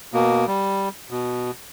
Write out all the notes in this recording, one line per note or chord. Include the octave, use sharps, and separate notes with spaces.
B2 A#3
G3
B2